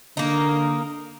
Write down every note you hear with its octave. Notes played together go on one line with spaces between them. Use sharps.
D3 A#3 D#4